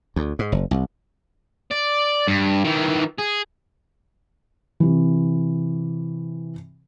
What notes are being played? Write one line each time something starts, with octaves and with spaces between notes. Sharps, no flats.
D2
G#2
F#1
C2
D5
G2
D#3 E3
G#4
C3 E3